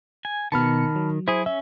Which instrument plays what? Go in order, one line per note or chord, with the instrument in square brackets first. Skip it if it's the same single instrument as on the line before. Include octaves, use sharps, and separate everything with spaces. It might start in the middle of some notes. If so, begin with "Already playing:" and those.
[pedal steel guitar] G#5
[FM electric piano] B2 B3 C#7 [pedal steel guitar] D#3 [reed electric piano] A5 B5 F6
[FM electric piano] F#3
[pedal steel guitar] E4 G#4 [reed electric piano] C5
[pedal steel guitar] C#4 [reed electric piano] E5